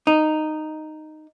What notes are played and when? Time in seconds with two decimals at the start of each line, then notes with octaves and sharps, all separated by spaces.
0.07 D#4